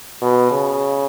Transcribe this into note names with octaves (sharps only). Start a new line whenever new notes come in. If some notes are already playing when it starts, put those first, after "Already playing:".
B2
C#3